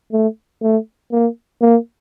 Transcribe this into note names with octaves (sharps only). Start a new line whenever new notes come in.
A3
A3
A#3
A#3